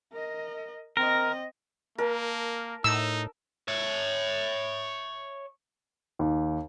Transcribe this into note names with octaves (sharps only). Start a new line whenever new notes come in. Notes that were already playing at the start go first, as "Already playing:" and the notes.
A#4 D#5
C4 A#4 D#5
A#3 A#4 A5
A2 D#4 E6
C#5 E5
D#2